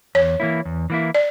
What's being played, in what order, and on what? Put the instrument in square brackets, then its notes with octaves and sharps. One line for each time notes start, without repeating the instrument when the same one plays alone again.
[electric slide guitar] E2 [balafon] C#5
[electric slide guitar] E3 A#3 E4
E2
E3 A#3 E4
[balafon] D5